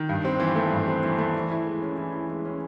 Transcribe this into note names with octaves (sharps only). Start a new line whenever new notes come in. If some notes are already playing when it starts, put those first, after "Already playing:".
Already playing: D#3
G2
C4
E3
A3
G2
C4
E3
A3
E3
E4
G#3
C#4
E3
E4
G#3
C#4